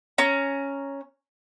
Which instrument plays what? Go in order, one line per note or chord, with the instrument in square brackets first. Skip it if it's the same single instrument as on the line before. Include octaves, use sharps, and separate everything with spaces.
[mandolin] C#4 A#5